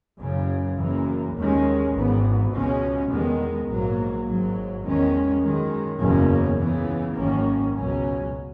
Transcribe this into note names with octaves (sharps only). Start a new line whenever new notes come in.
F#1 F#2 C#3
F#1 F#2 E3 A#3
D#2 D#3 G#3 C#4
G#1 G#2 E3 B3
C#2 B2 G#3 C#4
E2 D#3 G#3 B3
A#1 G#2 F#3 A#3
G#1 G#2 F#3
E2 D#3 G#3 C#4
F#2 D#3 G#3
F#1 E2 B2 A#3 C#4
C#2 C#3 E3 B3
G#1 F#2 D#3 A#3 C#4
C#2 B2 F#3 C#4